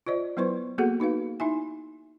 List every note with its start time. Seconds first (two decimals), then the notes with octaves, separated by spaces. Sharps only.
0.07 F4 C5 D5 D#5
0.37 F#3 B3 E4 B4 C5 C#6
0.78 A#3 B3 F#4 G#4 A4 F#5
1.00 D#4 F#4 B4 F5
1.40 D#4 E4 E5 G#5